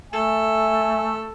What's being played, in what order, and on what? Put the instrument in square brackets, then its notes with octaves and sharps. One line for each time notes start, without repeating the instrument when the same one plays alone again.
[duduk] A3 [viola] A4 [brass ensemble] E5 G#5